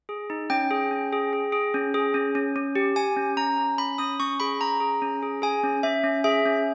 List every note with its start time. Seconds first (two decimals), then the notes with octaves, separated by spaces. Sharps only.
0.09 G#4
0.30 D#4
0.50 C#4 G5
0.71 G#4
0.91 C#4
1.12 G#4
1.33 G#4
1.52 G#4
1.74 C#4
1.94 G#4
2.14 C#4
2.35 C#4
2.56 C#4
2.76 G4
2.96 G4 G#5
3.17 C#4
3.37 C#4 A#5
3.58 C#4
3.78 C#4 B5
3.98 C#4 D#6
4.20 C#4 C#6
4.40 G#4 B5
4.61 C#4 A#5
4.80 G#4
5.02 C#4
5.22 G#4
5.42 G#4 G#5
5.64 C#4
5.83 C#4 E5
6.04 C#4
6.24 G#4 E5
6.46 C#4